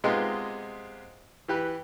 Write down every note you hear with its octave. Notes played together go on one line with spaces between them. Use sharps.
C3 G#3 B3 D#4 F4 G4
E3 G4 B4